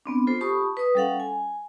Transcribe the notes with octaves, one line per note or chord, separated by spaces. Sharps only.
B3 C4 D4
F4 A4 C5
G4 A5 B5 C#6 D#6
B4 D#6
G3 C#4 A4 F5 F#5
G#5